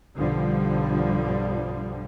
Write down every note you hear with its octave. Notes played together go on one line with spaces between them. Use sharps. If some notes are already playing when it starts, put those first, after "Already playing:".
B1 G2 D3 F3 G3